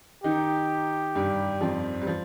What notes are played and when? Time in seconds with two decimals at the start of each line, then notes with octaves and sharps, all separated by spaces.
0.24 D#3 D#4 G4
1.15 G2 G3
1.61 F2 F3
2.01 G3
2.07 F3